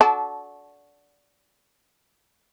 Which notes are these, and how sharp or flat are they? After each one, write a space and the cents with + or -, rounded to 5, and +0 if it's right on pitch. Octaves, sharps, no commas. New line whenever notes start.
D4 -20 F#4 -10 A4 -30